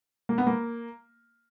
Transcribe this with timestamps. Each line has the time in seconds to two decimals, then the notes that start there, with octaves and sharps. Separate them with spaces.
0.29 A#3
0.38 B3
0.47 A#3